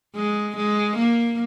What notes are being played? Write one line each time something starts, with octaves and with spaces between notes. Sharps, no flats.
G#3
G#3
A#3